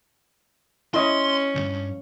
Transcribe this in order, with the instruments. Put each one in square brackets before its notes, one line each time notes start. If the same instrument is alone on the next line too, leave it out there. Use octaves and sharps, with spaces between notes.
[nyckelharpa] C#4 [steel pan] E4 D#5 [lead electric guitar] C6
[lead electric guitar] C2 G2